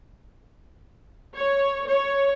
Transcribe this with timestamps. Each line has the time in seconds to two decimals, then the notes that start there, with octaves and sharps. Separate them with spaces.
1.36 C#5
1.89 C#5